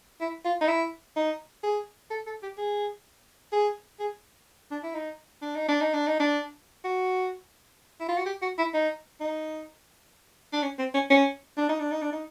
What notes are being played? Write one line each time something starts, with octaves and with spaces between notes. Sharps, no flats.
E4
F4
D#4
E4
D#4
G#4
A4
A4
G4
G#4
G#4
G#4
D4
E4
D#4
D4
D#4
D4
D#4
D4
D#4
D4
F#4
E4
F4
F#4
G4
F#4
E4
D#4
D#4
D4
C#4
C4
C#4
C#4
D4
D#4
D4
D#4
D4
D#4